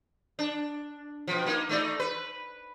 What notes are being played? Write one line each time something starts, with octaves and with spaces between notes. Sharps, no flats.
D4
B2 F3
A#3 D#4
A3 D#4 D5
B4